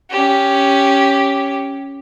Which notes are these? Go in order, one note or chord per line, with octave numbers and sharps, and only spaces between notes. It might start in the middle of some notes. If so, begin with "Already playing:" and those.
C#4 G4